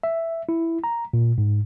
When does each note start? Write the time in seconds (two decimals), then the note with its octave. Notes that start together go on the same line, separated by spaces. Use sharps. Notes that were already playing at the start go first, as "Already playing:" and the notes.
0.04 E5
0.49 E4
0.84 A#5
1.14 A#2
1.38 G#2